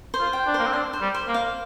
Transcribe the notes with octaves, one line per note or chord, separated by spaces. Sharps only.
C5
F4
G5
D4
A#3 C5
C4
D4 C6
C5
G3
C5
A#3
F5